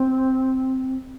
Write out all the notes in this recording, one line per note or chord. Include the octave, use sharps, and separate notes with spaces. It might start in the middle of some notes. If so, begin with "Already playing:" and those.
Already playing: C4